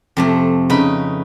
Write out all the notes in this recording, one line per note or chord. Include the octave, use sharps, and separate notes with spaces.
F2 C3 A3
C#3 D#4 B4 B5